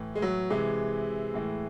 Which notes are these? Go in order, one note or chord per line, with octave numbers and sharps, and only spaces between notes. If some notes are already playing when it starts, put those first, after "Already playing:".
Already playing: A2 E3
G#3
F#3
C3 E3 G#3
A2 E3